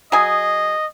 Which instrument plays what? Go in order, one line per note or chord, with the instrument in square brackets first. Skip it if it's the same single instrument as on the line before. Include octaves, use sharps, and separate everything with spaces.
[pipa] F#3 G#4 [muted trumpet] D#5